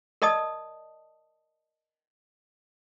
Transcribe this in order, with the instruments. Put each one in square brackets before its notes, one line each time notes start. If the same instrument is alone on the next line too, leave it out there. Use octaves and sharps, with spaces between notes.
[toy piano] A#4 D5 D#5 A5 D#6